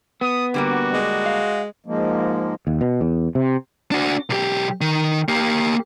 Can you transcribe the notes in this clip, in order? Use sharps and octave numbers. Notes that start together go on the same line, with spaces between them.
B3 D#6
D3 G3 A#3 F#4
G#3
F5
G#2 F3 G#3 A#3
D#2
B2
E2
C3
D4 F#4
B1 G4
D#3
A#3 G4